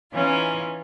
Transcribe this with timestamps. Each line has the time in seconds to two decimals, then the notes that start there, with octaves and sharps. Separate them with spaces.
0.12 E3 C#4 D#4 F4